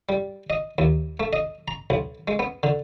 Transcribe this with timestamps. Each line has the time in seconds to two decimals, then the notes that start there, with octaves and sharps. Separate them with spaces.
0.09 G3
0.50 D#5
0.78 D#2
1.20 A3
1.33 D#5
1.68 A#5
1.90 B1
2.28 G#3
2.39 B3
2.63 D3